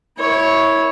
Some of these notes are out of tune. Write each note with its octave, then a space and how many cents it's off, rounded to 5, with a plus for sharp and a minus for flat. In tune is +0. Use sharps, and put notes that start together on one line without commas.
E4 -20 C#5 +0